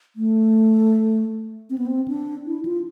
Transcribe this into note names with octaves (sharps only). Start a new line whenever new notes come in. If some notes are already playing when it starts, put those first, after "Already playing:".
A3
C4
B3
C4
D4
E4
F4